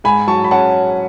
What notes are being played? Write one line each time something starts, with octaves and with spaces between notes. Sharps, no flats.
G#2 G#5 B5
F#3 A5 C#6
B5
C#4 F#5 A5